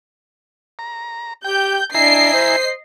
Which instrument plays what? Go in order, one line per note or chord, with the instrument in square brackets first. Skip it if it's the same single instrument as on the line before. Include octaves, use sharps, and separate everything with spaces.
[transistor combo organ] A#5
[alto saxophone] G4 [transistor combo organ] G5 [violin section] G6
[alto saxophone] D4 [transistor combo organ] E4 G#5 A#5 [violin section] D#5 C7
[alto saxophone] C5